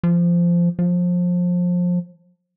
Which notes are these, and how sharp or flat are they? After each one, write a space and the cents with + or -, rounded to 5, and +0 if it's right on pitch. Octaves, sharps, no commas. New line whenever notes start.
F3 -15
F3 +25